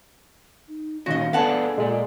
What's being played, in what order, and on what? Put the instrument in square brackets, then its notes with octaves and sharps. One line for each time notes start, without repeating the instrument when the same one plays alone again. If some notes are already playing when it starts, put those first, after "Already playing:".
[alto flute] D#4
[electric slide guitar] A#2 D#3 C#4 [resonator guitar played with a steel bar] F#4 D#5 [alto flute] F5
[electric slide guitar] B3 D4 G#4 [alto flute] A4 [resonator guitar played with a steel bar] F5 F#5 A5
[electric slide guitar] A#2 D5 [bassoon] G#3